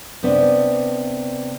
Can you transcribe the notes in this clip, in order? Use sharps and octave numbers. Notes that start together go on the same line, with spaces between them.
C3 B3 D4